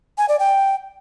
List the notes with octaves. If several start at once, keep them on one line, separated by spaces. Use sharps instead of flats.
G#5
D5
G5